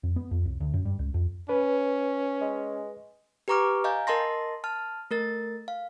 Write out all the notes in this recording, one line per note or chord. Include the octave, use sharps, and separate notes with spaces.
F2
B3
F2
C2
D2
F#2
G2
C#2
F2
C#4 B4
G#3
G4 B4 A#5 C#6 D6 F6
D#5 F5 G#5 A#5 G6
A#4 D#5 A5 C6 A#6
A5 F6
A3 A#4 A6
F5